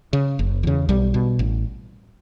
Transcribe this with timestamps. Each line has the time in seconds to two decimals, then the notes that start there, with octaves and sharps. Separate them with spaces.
0.13 C#3
0.39 F#1
0.63 E2 C#3
0.89 B1 G3
1.14 B2
1.39 A1